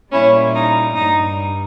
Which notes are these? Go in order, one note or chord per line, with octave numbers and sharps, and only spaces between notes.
A#2 G3 C#4 E4
D#4
G2 G3 D#4